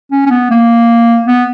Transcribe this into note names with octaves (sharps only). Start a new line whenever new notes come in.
C#4
C#4
B3
A#3
B3